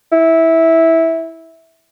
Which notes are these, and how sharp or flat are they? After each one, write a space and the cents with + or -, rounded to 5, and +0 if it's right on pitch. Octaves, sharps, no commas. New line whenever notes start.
E4 -15